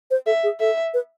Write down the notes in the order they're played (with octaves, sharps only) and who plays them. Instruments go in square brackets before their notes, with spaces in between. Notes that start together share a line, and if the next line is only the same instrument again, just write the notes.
[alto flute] C5
[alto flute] A4 [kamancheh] E5
[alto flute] G#4
[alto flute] A4 [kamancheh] E5
[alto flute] B4